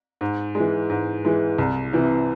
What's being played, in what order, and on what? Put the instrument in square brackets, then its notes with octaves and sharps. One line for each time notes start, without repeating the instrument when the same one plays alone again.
[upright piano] G#2
E3 G#3
G#2
E3 G#3
C2
C3 E3